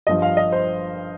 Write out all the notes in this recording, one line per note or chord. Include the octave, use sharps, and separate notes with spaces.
G1 G2 F3 D#5
F5
D#5
C5